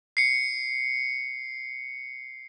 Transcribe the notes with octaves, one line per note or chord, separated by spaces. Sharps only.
C7 C#7